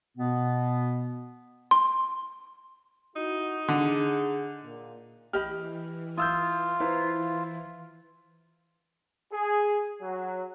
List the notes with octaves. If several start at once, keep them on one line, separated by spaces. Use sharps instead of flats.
B2 B3
C6
D#4 E4 F#4
D3 G#4
A#2
E3 G4 D#5 B5 F6
E4 F4 D#6 E6 G6
E4 B4 C5 F5 A#5
G#4
F#3